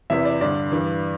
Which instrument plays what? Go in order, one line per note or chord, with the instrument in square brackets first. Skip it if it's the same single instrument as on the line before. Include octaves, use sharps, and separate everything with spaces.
[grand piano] E2 C3 E3 E5
D5
G2 D3 D5
G2 E3